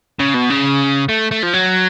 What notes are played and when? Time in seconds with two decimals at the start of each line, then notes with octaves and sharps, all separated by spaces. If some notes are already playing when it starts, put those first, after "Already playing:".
0.20 C#3
0.34 B2
0.50 C#3
1.09 A3
1.31 A3
1.43 F3
1.54 F#3